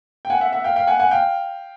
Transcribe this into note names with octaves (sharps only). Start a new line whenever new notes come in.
G5
F#5 G#5
E5 F#5
E5 F#5
F5 G5
F5 G5
F#5 G#5
F#5 G#5
F5 G5